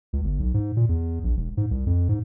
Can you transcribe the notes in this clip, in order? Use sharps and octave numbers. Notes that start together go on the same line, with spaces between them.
C#2
G1
B1
G#2
A#2
E2
A#1
E1
G#2
C2
F2
G#2